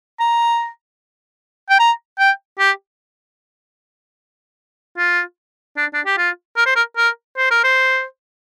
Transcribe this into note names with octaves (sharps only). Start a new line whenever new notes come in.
A#5
G5
A#5
G5
G4
F4
D4
D4
G4
F4
A#4
C5
A#4
A#4
C5
A#4
C5